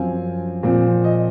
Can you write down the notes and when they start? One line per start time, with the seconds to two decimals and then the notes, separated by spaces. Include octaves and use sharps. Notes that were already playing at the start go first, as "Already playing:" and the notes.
Already playing: F#2 F3 C4 F5 G#5
0.63 A#2 F3 C4
1.04 D#5